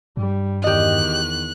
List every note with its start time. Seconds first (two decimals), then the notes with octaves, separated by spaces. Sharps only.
0.17 G2 G3
0.64 E2 D#3 G4 D#5 F#6